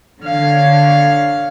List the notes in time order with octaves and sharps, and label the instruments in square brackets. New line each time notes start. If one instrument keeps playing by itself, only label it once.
[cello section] D3 C#5 [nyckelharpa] F5